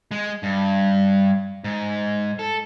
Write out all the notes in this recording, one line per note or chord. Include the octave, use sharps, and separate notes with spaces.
G#3
G2
G#2
A4